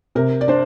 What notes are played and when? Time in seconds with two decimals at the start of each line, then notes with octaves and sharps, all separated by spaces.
0.15 C3 A#4
0.41 D5
0.48 D4 C5